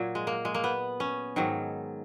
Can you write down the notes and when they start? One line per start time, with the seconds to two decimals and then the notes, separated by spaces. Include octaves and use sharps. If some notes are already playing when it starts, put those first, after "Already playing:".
Already playing: A#2 F#3
0.15 G#3
0.27 A#3
0.45 G#3
0.55 A#3
0.64 B3
1.00 C#4
1.36 G#2 D#3 F#3